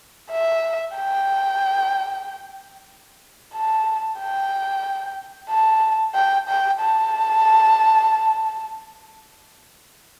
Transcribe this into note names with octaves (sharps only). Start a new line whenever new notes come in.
E5
G5
A5
G5
A5
G5
G5
A5